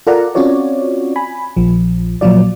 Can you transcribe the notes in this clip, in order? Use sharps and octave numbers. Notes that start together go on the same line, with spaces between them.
F4 A4 A#4 D5 F#5 A#5
C4 C#4 F4 F#4 C#5 D5
G#5 B5
A#1 F3
A#2 F3 F#3 F4 D5